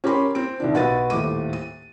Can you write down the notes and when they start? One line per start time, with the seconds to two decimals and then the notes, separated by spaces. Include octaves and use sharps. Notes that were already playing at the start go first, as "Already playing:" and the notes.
0.04 C#4 G4 A#4 B5 C6
0.35 C4 D7
0.60 C2 D#3 D4
0.74 B1 F#4 B4 A6 D#7
1.10 D#1 A2 D6 D#7
1.53 D#7